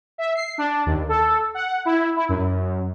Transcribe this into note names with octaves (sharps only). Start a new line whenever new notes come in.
E5
C7
D4
D#2
A4
F#5
E4
E4
F#2